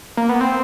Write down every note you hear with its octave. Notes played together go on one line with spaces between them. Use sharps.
A#3
B3
C4